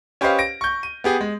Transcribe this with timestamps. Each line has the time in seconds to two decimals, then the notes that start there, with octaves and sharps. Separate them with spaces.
0.21 C#4 G4 B4 C5 D#5 F5
0.39 A#6 D7
0.61 C#6 G6
0.83 D#7
1.04 B3 G4 G#4
1.21 G#3